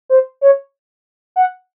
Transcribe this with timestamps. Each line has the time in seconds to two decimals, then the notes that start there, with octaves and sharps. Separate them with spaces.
0.09 C5
0.41 C#5
1.36 F#5